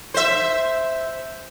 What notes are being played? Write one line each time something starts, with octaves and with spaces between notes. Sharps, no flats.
C5 E5